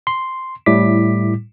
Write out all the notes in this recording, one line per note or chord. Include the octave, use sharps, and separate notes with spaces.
C6
A2 G3 E4 D6 B6